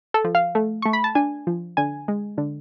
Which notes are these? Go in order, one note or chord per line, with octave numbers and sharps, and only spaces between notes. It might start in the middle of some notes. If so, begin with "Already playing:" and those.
A4
F3
F5
A3
A3 C#6
B5
A5
D4 G#5
F3
D3 G#5
G#3
D3